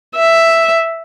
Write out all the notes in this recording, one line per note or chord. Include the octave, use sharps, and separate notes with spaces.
E5